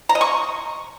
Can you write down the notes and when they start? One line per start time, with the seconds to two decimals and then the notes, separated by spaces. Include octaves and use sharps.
0.09 A#5
0.15 D#5
0.21 C#6